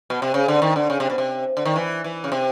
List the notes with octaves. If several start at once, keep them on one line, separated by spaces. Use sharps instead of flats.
B2
C3
C#3
D3
D#3
D3
C#3
C3
B2
C3
D3
D#3
E3
E3
C#3
C3